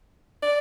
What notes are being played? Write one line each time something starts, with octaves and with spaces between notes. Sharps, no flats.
D5